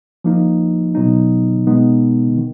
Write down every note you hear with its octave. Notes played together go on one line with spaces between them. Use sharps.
F3 A#3 D#4
B2 F#3 B3 D#4
B2 G#3 B3 D#4
D#3